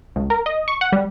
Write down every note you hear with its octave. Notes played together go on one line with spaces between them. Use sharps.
C#2
A#4
D#5
C#6
F#5
G3